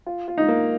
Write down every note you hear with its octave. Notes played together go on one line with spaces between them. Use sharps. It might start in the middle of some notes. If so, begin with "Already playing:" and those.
F4
F4
D#4
A#3